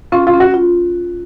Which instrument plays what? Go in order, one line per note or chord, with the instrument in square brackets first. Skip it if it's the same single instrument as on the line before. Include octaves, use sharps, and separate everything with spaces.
[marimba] C#4 [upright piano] F4
[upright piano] F4
[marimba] C#4
[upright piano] F#4
[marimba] F4